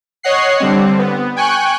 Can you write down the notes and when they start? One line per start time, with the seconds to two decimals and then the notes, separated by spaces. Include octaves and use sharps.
0.23 C#5 D#5 F#5 F#6 C7
0.60 D3 G3 C4
0.99 B3
1.36 G5 G#5 C#6 F#6